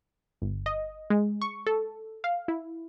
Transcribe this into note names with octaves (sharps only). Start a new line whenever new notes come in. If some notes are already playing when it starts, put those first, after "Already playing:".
G1
D#5
G#3
C#6
A4
F5
E4